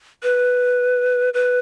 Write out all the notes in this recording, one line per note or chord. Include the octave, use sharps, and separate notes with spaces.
B4
B4